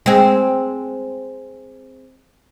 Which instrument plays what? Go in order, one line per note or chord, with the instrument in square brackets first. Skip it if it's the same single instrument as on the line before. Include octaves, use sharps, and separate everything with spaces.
[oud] G#3 C4